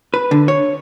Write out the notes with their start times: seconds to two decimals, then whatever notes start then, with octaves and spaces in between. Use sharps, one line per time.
0.14 B4
0.31 D3
0.48 C#5